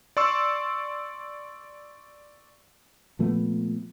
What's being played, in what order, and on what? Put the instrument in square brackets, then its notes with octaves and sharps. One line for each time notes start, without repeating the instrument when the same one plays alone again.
[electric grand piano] D5 C6 C#6 E6
[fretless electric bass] A#2 F3 A3 B3